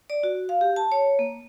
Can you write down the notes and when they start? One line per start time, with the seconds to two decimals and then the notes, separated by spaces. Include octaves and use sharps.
0.10 D5
0.23 F#4
0.49 F5
0.61 G4
0.76 A5
0.92 C#5
1.19 A#3